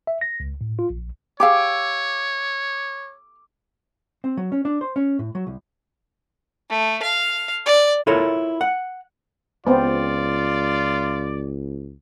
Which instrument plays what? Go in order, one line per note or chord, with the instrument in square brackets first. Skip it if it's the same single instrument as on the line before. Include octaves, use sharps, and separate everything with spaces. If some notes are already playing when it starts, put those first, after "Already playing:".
[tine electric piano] E5
A#6
C#2
A2
F4
A#1
[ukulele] G4 G#4 F5 [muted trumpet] C#5 [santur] D6 E6
[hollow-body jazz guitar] C4
F#3
C#4
D4
C5
C#4
A2
F#3
C2
[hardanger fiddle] A3
F5
D5
[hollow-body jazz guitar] E4 F4 A4 A#4 C#5
F#5
[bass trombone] C#2 [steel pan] B3 C4 [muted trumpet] F4 [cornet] D5